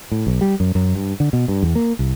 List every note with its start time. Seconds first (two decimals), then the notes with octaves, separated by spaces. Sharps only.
0.12 A2
0.27 B1
0.41 G3
0.60 F#2
0.75 F#2
0.95 G2
1.20 D3
1.33 B2
1.48 G2
1.63 E2
1.75 A#3
1.99 C2